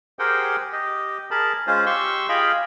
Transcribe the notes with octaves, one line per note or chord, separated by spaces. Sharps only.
G4 G#4 A#4 C5 F#5 G5
G4 D#5
G#4 A#4 A5 B5
G#3 C#4 F4 C5
G4 C6 C#6 E6
F4 G#4 D#5 F5 G5 B5